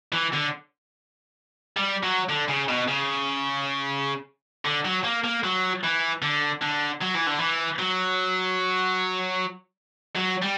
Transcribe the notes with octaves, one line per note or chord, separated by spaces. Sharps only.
E3
D3
G3
F#3
D3
C#3
B2
C#3
D3
F#3
A#3
A#3
F#3
E3
D3
D3
F#3
E3
D3
E3
F#3
F#3
G3